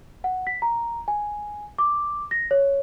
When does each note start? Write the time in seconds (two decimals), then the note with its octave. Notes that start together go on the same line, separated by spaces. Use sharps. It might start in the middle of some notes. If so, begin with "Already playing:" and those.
0.24 F#5
0.47 B6
0.62 A#5
1.08 G#5
1.79 D6
2.31 A#6
2.51 C#5